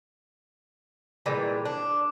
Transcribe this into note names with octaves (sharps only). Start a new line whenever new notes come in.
A#2 E3 G3 G#3
D4